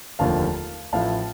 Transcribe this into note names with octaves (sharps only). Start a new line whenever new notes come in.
F1 D#2 D3 F3 A#3 F5 A5
A1 A2 F3 A3 F5 A5